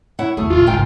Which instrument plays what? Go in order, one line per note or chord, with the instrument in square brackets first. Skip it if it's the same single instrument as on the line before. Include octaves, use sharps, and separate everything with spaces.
[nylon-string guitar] E4 C#5 F#5
[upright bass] E2 F4 [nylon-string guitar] A3 G#4
[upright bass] E2 A#2 [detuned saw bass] F4
[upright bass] G1 C#2 [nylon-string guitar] G#2 G5